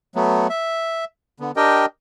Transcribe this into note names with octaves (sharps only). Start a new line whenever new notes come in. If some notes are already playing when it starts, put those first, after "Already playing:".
F#3 A3 B3
E5
D3 B3
D4 G4 A#4 D#5 G5